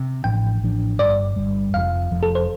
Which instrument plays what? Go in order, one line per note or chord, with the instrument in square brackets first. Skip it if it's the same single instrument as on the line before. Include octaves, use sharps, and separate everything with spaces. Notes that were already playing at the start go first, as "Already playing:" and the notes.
Already playing: [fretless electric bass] C3
[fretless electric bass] A1 A2 F3 D4 [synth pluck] G5
[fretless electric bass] A1 A2 F3 D4
[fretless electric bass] G1 G2 G3 [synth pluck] D5
[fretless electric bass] G1 G2 G3
[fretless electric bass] F1 F2 F3 [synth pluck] F5
[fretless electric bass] F1 F2 F3
[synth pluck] A4
C5